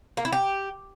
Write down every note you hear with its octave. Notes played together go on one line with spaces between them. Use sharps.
A#3
E4
G4